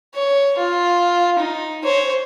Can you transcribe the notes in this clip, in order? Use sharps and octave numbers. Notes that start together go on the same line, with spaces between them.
C#5
F4
D#4
C5 C#5